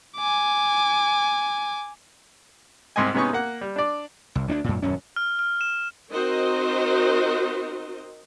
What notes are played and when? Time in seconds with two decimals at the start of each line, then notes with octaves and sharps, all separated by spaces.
0.17 G#5 D6
2.96 C2 G#2 C4 D#5 G#5
3.14 C3 G#3 B3 C#4 D#4 C#6
3.33 A#3 F#5
3.61 G3
3.76 D4 D5
4.35 C2
4.48 D2 C4 D4
4.64 F#2 A#2
4.82 D#1 F#2 C#4
5.16 F6
5.39 F6
5.61 E7
6.11 C4 D#4 F#4 A#4 C5 D#5